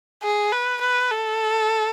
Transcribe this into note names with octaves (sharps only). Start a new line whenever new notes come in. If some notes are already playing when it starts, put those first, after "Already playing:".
G#4
B4
B4
A4